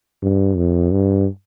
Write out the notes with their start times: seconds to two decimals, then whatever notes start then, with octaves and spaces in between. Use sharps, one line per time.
0.22 G2
0.56 F2
0.91 G2